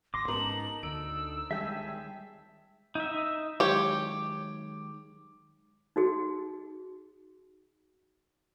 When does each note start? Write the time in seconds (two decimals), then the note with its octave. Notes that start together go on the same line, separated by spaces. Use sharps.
0.14 G#1 C6 D6 A#6
0.28 G#2 B3 C#4 D#4 A#4 A5 F#7
0.83 D2 D3 E6 D7
1.51 D#3 G3 G#3 G#4 E5 G5 A5
2.95 D#4 E5
3.60 D#3 F#3 G#3 G4 C#5 D6
5.96 D#4 F#4 G#4